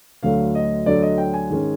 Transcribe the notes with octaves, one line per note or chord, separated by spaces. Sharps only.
D2 D3 F#3 A3 F5
D#5
D2 D3 F#3 A3 D5
D#5
G5
G#5
G#2 D#3 G#3 C#4